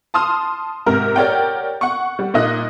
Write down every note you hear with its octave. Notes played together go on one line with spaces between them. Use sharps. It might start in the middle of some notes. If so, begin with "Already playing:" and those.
A5 C6 D#6 F6
G#2 C3 A#4 A#5
G4 A#4 C#5 D5 F#5 G5
F#5 C#6
G3
A#2 D#4 D#5 D#6 F#6